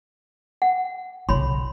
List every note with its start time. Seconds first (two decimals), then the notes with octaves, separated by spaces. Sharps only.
0.62 F#5
1.29 B1 C#3 C#5 B5 C6